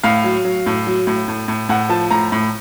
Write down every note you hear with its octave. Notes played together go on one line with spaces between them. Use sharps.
A2 F5
F#3
F#3
A2
F#3
A2
A2
A2
A2 F#5
F3 A5
A2 A#5
A2